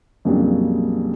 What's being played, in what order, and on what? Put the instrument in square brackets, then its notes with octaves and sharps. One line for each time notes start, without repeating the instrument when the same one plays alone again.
[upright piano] F2 A#2 C#3 F#3 G3 D4